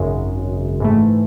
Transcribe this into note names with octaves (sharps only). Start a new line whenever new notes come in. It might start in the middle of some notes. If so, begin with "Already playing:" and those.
Already playing: G#1 F#2 C#3 G#3
G#2 E3 A3